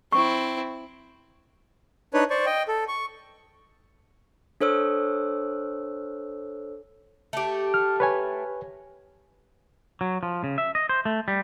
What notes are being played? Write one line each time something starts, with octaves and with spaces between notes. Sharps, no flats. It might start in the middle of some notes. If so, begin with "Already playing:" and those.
C4 E4 C#6
D4 D#4 B4 C#5
C5 D5 C#6
D#5 G5
A4
C#6
D4 A4 C5 C#5 E6
A3 G4
F6
B4 C#5 G#5
F#3
F3
C#3
E5
D#5
C5
A3
G3